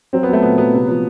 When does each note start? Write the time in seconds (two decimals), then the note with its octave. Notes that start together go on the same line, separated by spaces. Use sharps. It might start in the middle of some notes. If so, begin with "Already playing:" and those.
0.13 F#3 C4
0.23 B3
0.29 F#3 A3
0.42 A#2 B3
0.58 F#3 B3
0.74 C3
0.88 F3